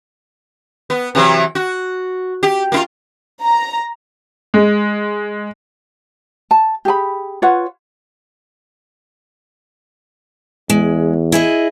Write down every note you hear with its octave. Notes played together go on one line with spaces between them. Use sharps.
B3
C3 E3 F#3
F#4
G4
A#3 E4 F4
A#5
G#3
A5
G4 G#4 G#5 B5
F4 B4 C#5 F#5
E2 G#3
E4 G#4 D#5